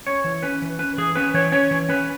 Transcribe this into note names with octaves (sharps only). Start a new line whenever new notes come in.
C#4 C#5
E3
C#4 B4
E3
C#4 B4
E3 G#4
C#4 B4
E3 C#5
C#4 C#5
E3
C#4 B4